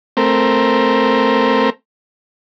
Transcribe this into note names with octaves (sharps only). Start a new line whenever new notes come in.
A3 C4 A#4